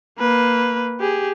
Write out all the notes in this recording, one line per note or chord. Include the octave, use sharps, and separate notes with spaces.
A#3 B4
G4 G#4